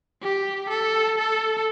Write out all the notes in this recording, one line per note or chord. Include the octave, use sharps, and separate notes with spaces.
G4
A4
A4